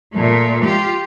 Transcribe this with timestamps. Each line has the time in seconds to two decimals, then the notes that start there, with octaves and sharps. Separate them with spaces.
0.14 A#2 A3
0.64 F4 G4